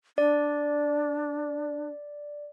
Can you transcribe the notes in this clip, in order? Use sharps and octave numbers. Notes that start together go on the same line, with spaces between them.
D4 D5